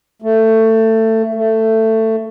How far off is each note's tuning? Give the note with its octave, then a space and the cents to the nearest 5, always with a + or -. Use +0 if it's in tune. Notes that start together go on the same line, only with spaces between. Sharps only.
A3 +20
A3 +15